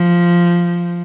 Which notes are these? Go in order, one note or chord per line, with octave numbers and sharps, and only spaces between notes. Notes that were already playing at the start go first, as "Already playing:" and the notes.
Already playing: F3